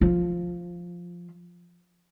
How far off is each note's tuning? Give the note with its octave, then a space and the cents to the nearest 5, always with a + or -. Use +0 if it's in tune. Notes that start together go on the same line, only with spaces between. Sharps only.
F3 +0 F4 +0